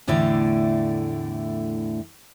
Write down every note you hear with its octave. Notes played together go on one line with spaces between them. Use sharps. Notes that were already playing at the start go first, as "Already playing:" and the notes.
E2 A2 D3 A3 E4 D5